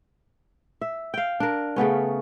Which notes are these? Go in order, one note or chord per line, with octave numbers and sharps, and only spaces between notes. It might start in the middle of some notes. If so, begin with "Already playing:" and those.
E5
F5 G5
D4 A#4
C#3 A3 B3 C#4